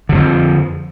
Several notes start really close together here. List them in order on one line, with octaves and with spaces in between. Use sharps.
D3 F2 F3